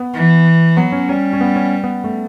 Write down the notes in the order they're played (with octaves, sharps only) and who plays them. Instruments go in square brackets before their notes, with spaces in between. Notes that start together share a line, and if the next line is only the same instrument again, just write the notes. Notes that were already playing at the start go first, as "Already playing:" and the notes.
Already playing: [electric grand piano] B3
[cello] E3
[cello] F#3 [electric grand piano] B3
[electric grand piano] C#4
[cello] G3 [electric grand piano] C#4
[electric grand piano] C#4
B3
C#4
B3
A3